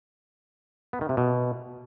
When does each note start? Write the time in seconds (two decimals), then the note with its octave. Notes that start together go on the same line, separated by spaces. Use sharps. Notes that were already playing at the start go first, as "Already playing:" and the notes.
0.93 B3
1.01 D#3
1.09 C3
1.17 B2